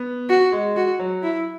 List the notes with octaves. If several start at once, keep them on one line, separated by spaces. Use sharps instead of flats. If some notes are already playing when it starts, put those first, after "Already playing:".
Already playing: B3
F#4
G#3
F#4
F#3
E4